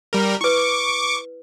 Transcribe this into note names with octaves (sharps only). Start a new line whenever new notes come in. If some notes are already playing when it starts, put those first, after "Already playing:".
G3 A#4
E4 B4 C#6 D6